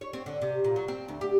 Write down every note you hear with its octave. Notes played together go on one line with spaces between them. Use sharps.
C#5
C4
D3
C3
A#2
F#3
C4
D2
G4